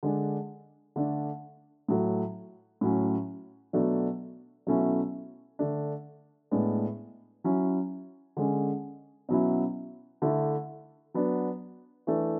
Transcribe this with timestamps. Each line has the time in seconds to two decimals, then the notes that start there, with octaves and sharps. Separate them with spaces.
0.03 D3 G#3 D4
0.96 D3 A3 D4
1.88 A2 F#3 A3
2.81 A2 F#3 C#4
3.73 B2 F#3 A3 D4
4.67 B2 F#3 A3 C#4 E4
5.59 D3 A3 D4
6.51 A2 G#3 B3 D4
7.44 F#3 C#4 E4
8.37 D3 G#3 C#4
9.29 B2 F#3 C#4 E4
10.22 D3 A3 E4
11.14 F#3 B3 D4
12.07 E3 A3 D4